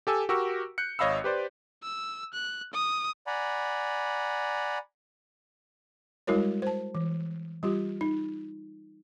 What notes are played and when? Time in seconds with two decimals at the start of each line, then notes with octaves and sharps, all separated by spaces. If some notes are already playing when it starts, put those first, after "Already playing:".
0.07 G4 A4 G#5 E6
0.29 F#4 G4 A#4 C#6 E6
0.78 F#6 G6 C#7
0.99 G#1 C#5 D#5 F5 B5 E6
1.24 G4 B4 C5 D5
1.83 E6
2.34 F#6
2.74 D#6
3.27 D5 F#5 G#5 A#5 B5
6.27 G3 G#3 E4 F#4 A#4 C#5
6.62 C5 A5
6.95 E3
7.63 G3 F4 G4
8.01 D#4